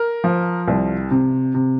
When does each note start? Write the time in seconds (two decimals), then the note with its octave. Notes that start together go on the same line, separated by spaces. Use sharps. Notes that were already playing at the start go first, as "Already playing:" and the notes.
Already playing: A#4
0.24 F3
0.68 C2
1.11 C3
1.55 C3